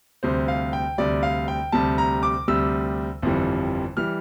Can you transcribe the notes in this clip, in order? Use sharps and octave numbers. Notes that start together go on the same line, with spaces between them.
D2 C3 G3 C5
F5
G5
D2 C3 G3 D5
F5
G5
D2 C3 G3 A5
A#5
D6
D2 C3 G3 E6
G1 F2 E3 G3
E3 G3 F6